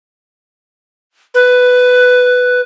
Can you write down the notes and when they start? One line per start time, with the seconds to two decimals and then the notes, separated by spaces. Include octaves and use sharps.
1.34 B4